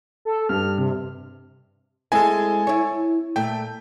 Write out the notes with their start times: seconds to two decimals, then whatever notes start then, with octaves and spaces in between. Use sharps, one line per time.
0.25 A4
0.49 G2 F6
0.78 C3
2.12 G#3 C4 E4 A4 G#5
2.67 E4 C#5
3.36 A#2 A3 G5